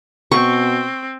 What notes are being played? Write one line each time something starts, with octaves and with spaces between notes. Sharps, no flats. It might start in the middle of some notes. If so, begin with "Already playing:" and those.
B2 C4 C#6